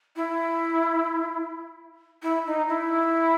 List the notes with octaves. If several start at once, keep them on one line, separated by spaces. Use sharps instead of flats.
E4
E4
D#4
E4